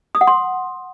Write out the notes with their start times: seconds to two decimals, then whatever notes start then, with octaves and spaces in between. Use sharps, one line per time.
0.15 D#6
0.21 F#5
0.27 C6